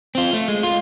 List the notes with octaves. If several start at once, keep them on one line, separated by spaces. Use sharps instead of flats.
C4 F4
A3
G#3
F4